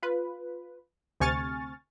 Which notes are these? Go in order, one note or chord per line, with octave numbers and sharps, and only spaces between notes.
F4 B4
D2 C3 G#5 C#6 F6 A6